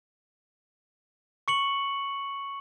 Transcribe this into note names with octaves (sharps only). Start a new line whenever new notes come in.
C#6 C#7 F#7